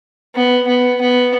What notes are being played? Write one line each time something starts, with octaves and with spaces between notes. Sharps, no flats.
B3
B3
B3